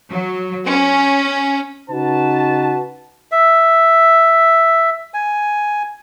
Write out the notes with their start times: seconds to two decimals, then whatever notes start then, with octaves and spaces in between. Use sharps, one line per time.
0.11 F#3
0.67 C#4
1.90 C#3 D#4 F#4 B4 A5
3.32 E5
5.14 G#5